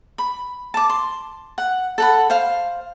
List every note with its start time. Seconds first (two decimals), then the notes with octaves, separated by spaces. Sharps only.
0.18 B5
0.74 A5 D6
0.89 C6
1.58 F#5
1.98 A4 F#5 B5
2.30 C5 F5